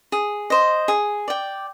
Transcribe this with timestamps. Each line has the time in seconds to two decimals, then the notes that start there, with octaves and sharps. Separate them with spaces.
0.12 G#4
0.50 C5 D#5
0.88 G#4
1.28 D5 G5